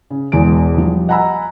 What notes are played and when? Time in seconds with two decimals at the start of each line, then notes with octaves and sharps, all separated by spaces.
0.10 C#3
0.32 E1 E2 G#3 D7
0.78 F3 G3
1.08 D#5 F#5 G#5 A#5 B5 E6